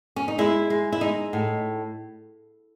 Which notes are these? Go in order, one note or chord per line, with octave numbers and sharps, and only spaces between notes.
C#4
D#4
G#3 E4
G#3
E4
G#3 D#4
A2